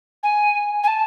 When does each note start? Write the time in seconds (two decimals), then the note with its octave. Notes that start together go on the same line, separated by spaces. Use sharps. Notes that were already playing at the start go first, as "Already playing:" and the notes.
0.23 G#5
0.83 G#5
0.87 A5